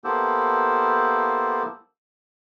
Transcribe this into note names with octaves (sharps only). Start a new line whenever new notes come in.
A#3 B3 E4 G4 A4 C5